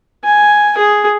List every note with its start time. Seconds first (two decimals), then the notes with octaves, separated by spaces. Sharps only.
0.24 G#5
0.78 G#4